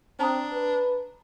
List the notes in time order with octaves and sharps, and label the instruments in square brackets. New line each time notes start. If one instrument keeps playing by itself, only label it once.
[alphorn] C4 [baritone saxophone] D4 [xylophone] A5 A#5 D#6
[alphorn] B4